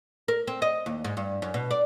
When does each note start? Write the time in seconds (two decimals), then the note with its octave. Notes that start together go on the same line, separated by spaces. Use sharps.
0.28 A#4
0.47 C4
0.62 D#5
0.86 D#2
1.05 G#2
1.17 G2
1.42 F#2
1.54 B2
1.71 D5